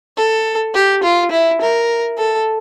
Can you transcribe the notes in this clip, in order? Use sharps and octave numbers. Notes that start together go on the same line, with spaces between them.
A4
G4
F4
E4
A#4
A4